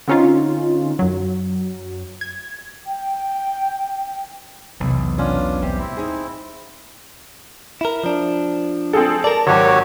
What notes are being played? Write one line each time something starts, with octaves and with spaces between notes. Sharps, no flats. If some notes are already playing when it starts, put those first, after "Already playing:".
D3 C4 C#4 D#4 F4
F#2 F#3
G#6
G5
B1 E2 C3 E3
C#4 D4 F4 F#5
D1 C3 G3 G4
C4 E4
D#4 G#4
E4 A#4
F3 D4
C4 G#4 A4
A#4 D5 A5
G#1 F#3 F#4 G4 C#5